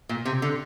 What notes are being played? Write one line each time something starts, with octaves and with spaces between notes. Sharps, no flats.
A#2
C3
D3